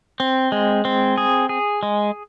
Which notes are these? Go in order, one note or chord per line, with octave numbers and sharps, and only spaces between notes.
C4
G#3
C4
G#4
G#4
G#3